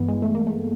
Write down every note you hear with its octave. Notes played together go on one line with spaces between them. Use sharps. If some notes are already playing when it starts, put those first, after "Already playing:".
Already playing: G2 E3 B3
G#3
A3
A#3
A3